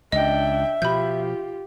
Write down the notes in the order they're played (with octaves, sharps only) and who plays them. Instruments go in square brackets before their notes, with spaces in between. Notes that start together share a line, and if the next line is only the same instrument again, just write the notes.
[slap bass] C#2 [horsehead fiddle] D4 G5 [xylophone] D#5 [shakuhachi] E5
[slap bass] B2 F3 [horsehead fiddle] F4 G4 [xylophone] B5 G6